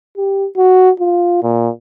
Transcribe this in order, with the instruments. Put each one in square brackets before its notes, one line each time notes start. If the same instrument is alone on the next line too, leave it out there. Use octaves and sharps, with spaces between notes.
[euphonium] G4
F#4
F4
A#2